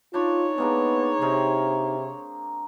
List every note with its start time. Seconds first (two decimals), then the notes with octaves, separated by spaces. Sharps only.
0.14 D4 D#4 F4 C#5 B5
0.58 G#3 A#3 B3 D4
1.21 C3 C4 G#4 A#4